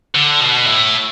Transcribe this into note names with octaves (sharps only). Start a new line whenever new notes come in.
D3
B2
A2